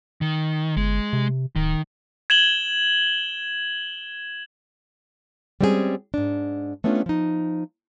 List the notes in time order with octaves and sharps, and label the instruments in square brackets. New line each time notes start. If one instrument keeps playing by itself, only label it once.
[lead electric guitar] D#3
[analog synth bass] G1 [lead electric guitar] G#3
[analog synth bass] C3
[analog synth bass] D1 [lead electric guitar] D#3
[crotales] G#6 E7 F#7 G7
[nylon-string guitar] G3 G#3 C4 C#4 F4 G#4
G#2 D4
A3 B3 C#4 D4 F4
F3 D#4